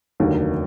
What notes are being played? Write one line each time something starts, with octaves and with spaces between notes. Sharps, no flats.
F1 D#2 D3 F#3 A#3